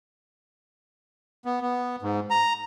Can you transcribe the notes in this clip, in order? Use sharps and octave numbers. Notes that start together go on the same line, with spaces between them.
B3
B3
G#2
A#5